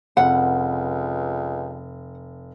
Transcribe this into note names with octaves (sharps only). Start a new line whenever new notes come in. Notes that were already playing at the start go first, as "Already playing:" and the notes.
F1 C#2 F#5